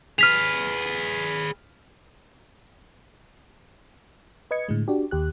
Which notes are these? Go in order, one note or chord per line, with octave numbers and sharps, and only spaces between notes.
G#4 B4 F6 B6 F7
B4 D#5 G#6 C#7
A2 D3 G#3
D4 F#4 G4
D#2 G4 F#6